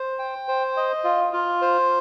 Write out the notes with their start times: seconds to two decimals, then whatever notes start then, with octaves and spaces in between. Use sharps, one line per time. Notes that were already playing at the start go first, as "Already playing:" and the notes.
Already playing: C5
0.19 G5
0.48 C5
0.77 D#5
1.04 F4
1.33 F4
1.62 C5